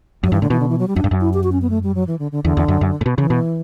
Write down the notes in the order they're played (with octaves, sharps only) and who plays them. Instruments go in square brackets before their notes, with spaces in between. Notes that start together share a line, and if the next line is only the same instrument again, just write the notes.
[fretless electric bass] F#2 [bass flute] F#3
[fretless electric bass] G2 [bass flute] E3
[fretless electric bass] A2 [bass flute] D3
[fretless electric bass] B2 [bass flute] E3
[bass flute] D3
E3
F#3
G3
[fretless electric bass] F#2 [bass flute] D4
[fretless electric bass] G2
F#2
[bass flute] E4
G4
F#4
C#4
B3
A3
G3
F#3
E3
D3
D3
[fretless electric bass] E2 [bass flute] D3
[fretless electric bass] E2
F#2
F#2
A2
B2
[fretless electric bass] C#3 [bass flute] E3
[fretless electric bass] B2